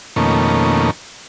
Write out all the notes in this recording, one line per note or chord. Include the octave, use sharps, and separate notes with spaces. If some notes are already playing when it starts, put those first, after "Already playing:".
F2 B2 D#3 A3 A#3 C#4